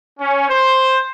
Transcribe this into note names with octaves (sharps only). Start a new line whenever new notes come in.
C#4
C5